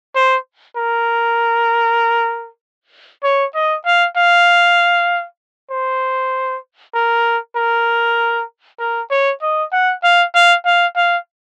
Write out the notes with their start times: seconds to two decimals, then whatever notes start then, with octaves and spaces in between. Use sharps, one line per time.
0.15 C5
0.77 A#4
3.23 C#5
3.55 D#5
3.86 F5
4.17 F5
5.71 C5
6.95 A#4
7.56 A#4
8.80 A#4
9.11 C#5
9.42 D#5
9.72 F#5
10.03 F5
10.35 F5
10.65 F5
10.96 F5